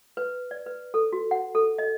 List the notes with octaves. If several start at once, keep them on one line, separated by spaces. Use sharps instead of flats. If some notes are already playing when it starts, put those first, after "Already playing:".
B4
D5
B4
A4
F#4
F#5
A4
D#5